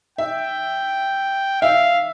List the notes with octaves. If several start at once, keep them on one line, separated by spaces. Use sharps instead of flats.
E5 G5
E5 F5